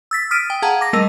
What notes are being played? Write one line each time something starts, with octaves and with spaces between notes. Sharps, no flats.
E6 A6 B6
D#6 F6 B6 D7 D#7
G5
G#4 F5 F#5 A5 A#5
D6 A#6
G3 A3 A#4 D#5